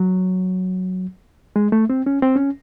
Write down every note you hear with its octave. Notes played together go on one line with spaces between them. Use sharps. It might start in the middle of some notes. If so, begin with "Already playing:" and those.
Already playing: F#3
G#3
A3
C4
C#4
C4
C#4